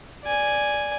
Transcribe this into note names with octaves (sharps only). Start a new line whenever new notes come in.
D5 G#5